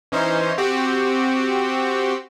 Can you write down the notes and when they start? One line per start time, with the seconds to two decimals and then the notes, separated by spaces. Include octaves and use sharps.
0.12 E3 C#4 D#4 C5
0.58 C4 F#4 G4